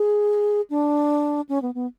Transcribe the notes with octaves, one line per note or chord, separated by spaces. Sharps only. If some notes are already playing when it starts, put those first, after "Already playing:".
Already playing: G#4
D4
C#4
B3
B3